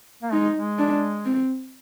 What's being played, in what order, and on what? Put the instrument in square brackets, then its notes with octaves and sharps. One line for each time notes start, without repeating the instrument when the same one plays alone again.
[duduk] A#3
[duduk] G#3 [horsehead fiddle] D#4
[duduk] G#3
[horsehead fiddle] D4
C4